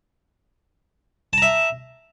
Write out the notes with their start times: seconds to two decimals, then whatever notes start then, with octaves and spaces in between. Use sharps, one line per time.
1.33 A5
1.38 A#5
1.42 E5